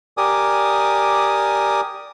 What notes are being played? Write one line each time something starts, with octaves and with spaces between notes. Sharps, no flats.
G4 A#4 D5 G#5 D6 D#6